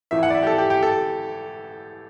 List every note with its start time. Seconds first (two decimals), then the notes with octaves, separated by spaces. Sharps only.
0.11 A1 A2 E3 E5
0.23 F#5
0.30 D5
0.35 E5
0.43 G4
0.47 A4
0.58 G4
0.70 G4
0.83 A4